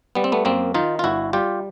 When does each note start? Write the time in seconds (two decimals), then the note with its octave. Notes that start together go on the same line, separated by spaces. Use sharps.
0.15 G3 B3
0.24 C4
0.32 A3 B3
0.45 F#2 A#3 C4
0.74 D#3 D#4 F4
0.99 F4
1.04 G1 E4 F#4
1.33 G3 F4 G4